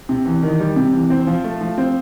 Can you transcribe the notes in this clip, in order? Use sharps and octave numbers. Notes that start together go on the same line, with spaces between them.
C3
E2
D#3
G3
C3
E2
C4
F3
A3
F3
C4